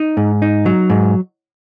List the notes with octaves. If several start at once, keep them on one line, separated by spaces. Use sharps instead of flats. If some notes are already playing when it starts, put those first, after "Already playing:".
Already playing: D#4
G#2
D#4
F#3
G#2